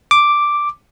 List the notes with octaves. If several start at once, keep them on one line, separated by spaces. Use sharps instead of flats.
D6